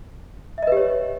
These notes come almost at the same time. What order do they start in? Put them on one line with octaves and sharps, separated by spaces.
E5 D#5 B4 G4 C#5